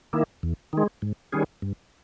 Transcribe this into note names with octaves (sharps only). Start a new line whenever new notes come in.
D#3 A#3 E4
E2
D#3 G#3
G#2
D#3 G3 C#4 G#4
G2